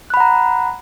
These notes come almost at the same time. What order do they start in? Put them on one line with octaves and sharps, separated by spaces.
F#6 B5 F#5 A#5